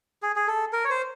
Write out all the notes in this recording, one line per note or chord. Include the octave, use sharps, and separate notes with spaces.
G#4
G#4
A4
A#4
C#5
C5